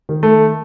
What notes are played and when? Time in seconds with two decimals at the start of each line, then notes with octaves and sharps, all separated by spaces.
0.09 D#3
0.23 A3